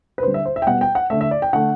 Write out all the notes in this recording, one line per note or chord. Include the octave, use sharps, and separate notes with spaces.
B4
D3 G3 C5
E5
C5
E5
G5
B2 G3 F#5
G5
F#5
D3 A3 E5
E5
D5
G5
D3 A3 F#5